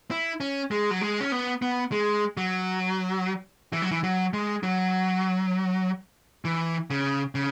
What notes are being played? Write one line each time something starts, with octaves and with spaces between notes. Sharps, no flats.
E4
C#4
G#3
F#3
G#3
C#4
B3
B3
G#3
F#3
E3
F#3
E3
F#3
G#3
F#3
E3
C#3
C#3